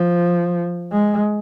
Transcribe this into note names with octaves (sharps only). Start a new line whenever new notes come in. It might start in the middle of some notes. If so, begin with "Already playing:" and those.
Already playing: F3
G#3